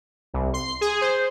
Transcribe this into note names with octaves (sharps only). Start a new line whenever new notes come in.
C2
C6
G#4
C5